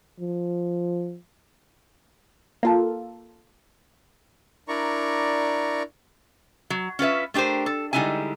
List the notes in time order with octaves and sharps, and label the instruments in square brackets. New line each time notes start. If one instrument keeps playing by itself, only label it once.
[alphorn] F3
[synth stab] A#3 F4 A4
[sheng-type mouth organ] D4 E4 A#4 D5 A#5 C#6
[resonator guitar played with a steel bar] F#3
C#4 F4 B4 E5
A3 D4 G4 A#4 C5
A4
D3 G3 G#3 D#4 E4 G#5